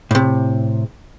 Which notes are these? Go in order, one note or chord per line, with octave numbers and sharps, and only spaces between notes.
A2 C3